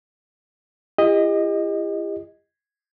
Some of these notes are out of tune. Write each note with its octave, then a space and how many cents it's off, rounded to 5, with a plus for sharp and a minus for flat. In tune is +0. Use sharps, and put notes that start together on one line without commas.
E4 +40 G4 +40 D#5 +0